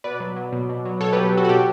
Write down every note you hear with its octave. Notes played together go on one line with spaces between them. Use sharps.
B2 B4 D5
F#3
F#3
B2
B2
F#3
B2 A4 C#5
F#3 G4 B4
G4
F#3 F#4 A4
F#4
B2 G4